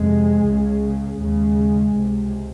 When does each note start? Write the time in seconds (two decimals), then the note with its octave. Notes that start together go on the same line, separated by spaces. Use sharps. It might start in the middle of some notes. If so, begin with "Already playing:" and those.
Already playing: F2 C3 G#3
0.46 C#2 C#3
1.20 D#2 C#3 G#3
1.96 C#2 C3